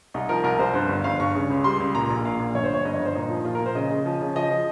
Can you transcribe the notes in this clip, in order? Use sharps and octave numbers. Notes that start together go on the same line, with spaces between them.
C2 D#4
F3 A#4
C2 A#4
C2 C5
G2 C5
G1
G1 F5
G2 C#6
C#3
C#2
G3 C6
C#2
A#2 A#5
A#1
A#2 F5
A#1
G1 C#5
C5
G1 C#5
G1 D#5
C#5
G1
C5
A#2 D#4
F3
A#2 F4
A#4
A#2
C5
C#3 D#5
C#3
F3
C#3
F3 D#5
F3